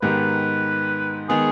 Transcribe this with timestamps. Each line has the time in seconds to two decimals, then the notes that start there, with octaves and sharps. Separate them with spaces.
0.02 G#2 D#3 B3 D#4 G4 B4
1.29 D#3 G#3 B3 G#4